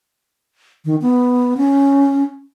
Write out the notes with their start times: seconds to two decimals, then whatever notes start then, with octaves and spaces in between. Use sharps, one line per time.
0.85 D#3
1.02 B3
1.57 C#4